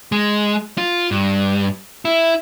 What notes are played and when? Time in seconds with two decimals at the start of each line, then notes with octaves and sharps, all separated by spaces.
0.12 G#3
0.78 F4
1.11 G2
2.05 E4